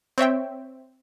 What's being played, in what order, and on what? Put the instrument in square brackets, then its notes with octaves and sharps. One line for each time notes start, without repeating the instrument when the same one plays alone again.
[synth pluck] C4 C#5 E5 G5